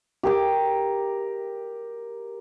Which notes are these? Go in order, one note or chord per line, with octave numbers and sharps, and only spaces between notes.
G4 A#4 D6